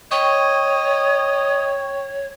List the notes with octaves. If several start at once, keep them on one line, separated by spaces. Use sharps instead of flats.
C#5 D#5 G5 C#6